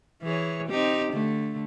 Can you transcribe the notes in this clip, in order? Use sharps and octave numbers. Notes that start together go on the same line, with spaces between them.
E3 G#4 C#5
C4 D#4 G4
D3 A3